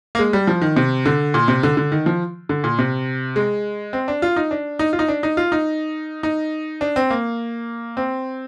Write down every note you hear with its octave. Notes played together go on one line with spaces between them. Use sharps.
A#3
G#3
G3
F3
D#3
C3
D3
A#2
C3
D3
D3
D#3
F3
D3
A#2
C3
G#3
C4
D4
F4
D#4
D4
D#4
F4
D#4
D4
D#4
F4
D#4
D#4
D4
C4
A#3
C4